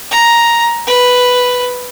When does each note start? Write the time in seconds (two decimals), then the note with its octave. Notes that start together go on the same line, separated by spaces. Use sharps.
0.11 A#5
0.87 B4